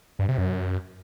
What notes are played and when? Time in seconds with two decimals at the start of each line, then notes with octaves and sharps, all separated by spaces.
0.19 G2
0.29 C3
0.38 F#2